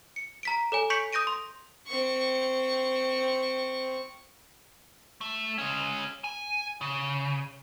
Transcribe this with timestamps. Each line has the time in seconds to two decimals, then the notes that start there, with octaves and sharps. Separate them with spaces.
0.16 C#7
0.43 A#5 B6 D7
0.72 A4 C#5 G#5
0.90 C#6 G6 B6 C#7 D7 F7
1.13 D#6 G6 A#6 D7 D#7
1.27 C6
1.88 C4 C#6
5.21 A3
5.58 G#3 C#4
6.24 G#5
6.81 C#3